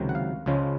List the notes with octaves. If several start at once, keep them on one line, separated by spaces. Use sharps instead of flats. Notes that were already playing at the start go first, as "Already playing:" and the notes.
Already playing: C#2 C3 D#3 F#3
F#5
F5
C#2 C#3 F3 G#3 C#4